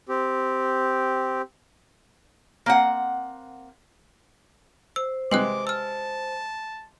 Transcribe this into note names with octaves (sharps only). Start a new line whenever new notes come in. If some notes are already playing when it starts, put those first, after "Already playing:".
C4 G4
A#3 C4 F#5
C5 E6
C3 G#3 B4 G5 D6 F#6
A5 E6 F6